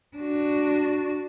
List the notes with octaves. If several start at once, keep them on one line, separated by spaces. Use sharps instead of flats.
D4 F#4